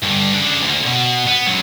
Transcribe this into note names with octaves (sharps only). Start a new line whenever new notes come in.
G2 D3
C#3 D4
D2 D3
B2
B3
C#2 F#3